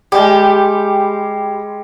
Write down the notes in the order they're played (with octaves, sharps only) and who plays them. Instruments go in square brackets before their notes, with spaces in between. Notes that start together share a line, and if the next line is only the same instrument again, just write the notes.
[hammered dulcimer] G3 G#3 [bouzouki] G4